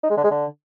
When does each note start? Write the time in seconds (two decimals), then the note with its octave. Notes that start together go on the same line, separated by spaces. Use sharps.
0.03 D#4
0.10 G#3
0.17 D3
0.24 G#3
0.31 D3